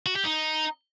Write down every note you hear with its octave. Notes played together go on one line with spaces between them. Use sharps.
F#4
G4
D#4